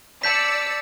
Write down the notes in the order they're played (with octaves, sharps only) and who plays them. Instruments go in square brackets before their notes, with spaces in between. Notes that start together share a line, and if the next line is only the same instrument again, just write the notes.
[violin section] D5 E6 C#7 [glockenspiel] A5 G6 B6